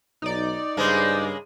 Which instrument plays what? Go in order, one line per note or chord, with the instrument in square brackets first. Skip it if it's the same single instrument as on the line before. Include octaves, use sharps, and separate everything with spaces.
[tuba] B1 [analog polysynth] D#4 D5
[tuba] G2 [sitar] C#3 G#3 A#3 [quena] C5